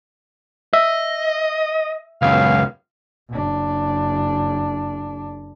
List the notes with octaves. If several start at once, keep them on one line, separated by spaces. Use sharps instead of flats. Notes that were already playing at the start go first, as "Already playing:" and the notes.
D#5 E5
C#2 F#2 B3 C#4 F5
F#1 D4